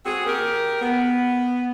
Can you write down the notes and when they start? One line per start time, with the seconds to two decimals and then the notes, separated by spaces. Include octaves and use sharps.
0.06 C4 F#4 G#4
0.27 G4 A#4
0.82 B3